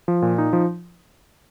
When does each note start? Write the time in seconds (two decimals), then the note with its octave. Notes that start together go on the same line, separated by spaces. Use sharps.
0.08 F3
0.22 A#2
0.38 D#4
0.53 F3